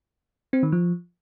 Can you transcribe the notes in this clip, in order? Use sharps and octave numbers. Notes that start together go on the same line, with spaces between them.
C4
D#3
F3